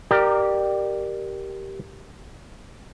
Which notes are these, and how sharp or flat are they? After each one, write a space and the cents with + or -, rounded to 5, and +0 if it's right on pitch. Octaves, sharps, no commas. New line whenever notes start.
G4 -10 A#4 +0 D5 +30